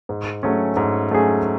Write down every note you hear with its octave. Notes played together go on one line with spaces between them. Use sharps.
G#2
F#3 A3 C#4 G#4
G#2
F#3 A3 C#4 G#4